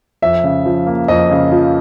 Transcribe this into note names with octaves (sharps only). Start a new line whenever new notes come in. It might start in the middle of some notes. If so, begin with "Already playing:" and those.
F2 E5
C#3
F3
A#3
F2 D#5
C#3
F3